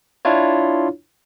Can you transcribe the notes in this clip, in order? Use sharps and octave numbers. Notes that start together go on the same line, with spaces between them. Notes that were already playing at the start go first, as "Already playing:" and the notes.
D4 E4 F4 C#5